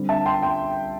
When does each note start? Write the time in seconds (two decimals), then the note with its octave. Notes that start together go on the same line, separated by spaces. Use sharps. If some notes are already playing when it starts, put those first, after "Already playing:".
Already playing: D3 G3 C4
0.09 E5 A5
0.25 G5 C6
0.42 G5 C6